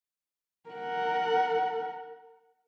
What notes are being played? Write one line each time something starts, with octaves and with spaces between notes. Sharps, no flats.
A#4 F#5